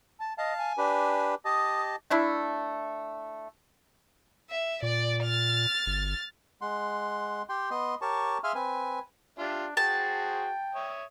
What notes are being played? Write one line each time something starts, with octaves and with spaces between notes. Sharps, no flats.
A5
D#5 F5 A5
G#5
D4 G4 B4
G4 D#5 A5 D#6
A3 D4 E4
E5
A#2 D5
F6 A6
G1
G#3 F#5 C6
G4 G5 C6
B3 D#5 C6
G4 A#4 C#5 A5 C#6
G#4 E5 F5 G#5 C6 F6
C4 B4 G#5
D4 F4 G4 E5
F#4 G#4 C5 G5 A5
C#5 E5 D#6